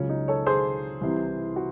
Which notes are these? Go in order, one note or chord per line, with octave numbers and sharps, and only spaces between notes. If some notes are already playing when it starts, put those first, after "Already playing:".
Already playing: C#2 C#3 F#3 C#4
D#4
A4 C#5
G#4 C5
C2 C3 E3
F#4